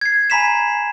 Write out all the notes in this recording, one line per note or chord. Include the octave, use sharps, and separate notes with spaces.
G#6 C7
G#5 A#5 B5 B6 C7 E7